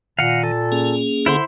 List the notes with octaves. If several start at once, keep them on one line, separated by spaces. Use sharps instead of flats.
A#2 D#3 F5 F#5
A4
A#3 C#4 G#4
D3 E4 C5 C6